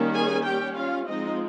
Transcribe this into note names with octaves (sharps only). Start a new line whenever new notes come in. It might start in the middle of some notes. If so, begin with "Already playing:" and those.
Already playing: D#3 G3 A#3 C#4
G#4 G#5
G3 C#4 G4 G5
F4 F5
F3 G#3 C4 D#4 D#5